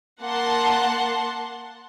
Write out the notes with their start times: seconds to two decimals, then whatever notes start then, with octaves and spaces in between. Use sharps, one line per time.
0.22 A#3 F#5 A5 C6